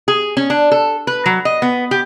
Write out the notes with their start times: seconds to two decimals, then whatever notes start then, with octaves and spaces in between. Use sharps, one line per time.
0.08 G#4
0.37 C#4
0.50 D4
0.72 A4
1.07 B4
1.26 F#3
1.45 D#5
1.62 B3
1.91 G4